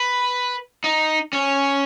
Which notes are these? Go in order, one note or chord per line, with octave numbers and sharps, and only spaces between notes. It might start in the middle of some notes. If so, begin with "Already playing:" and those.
Already playing: B4
D#4
C#4